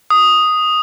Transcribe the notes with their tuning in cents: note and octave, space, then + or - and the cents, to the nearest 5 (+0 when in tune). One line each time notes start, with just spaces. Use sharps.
D#6 +0